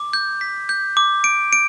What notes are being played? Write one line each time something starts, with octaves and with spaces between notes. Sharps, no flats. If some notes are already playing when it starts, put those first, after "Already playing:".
Already playing: D6
G6
B6
G6
D6
D7
D7